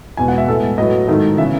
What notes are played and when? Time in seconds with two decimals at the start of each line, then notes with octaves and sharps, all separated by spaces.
0.17 E2 B2 G#3 G#5
0.28 F#5
0.38 E5
0.48 A2 G#3 B3 A4
0.77 A2 F#3 B3 D#5
1.08 G#2 D#3 A3
1.38 C#3 E3 B3 E5